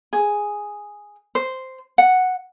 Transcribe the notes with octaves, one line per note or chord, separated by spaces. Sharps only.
G#4
C5
F#5